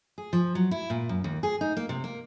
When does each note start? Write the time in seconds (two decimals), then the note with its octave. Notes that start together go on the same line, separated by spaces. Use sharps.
0.18 G#4
0.33 F3
0.55 F#3
0.71 E4
0.90 A#2
1.09 F#2
1.24 D#2
1.43 G#4
1.61 D#4
1.77 A#3
1.89 C3
2.04 A#3